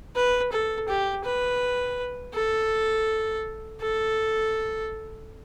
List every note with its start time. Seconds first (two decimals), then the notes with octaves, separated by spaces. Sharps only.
0.16 B4
0.52 A4
0.89 G4
1.25 B4
2.35 A4
3.81 A4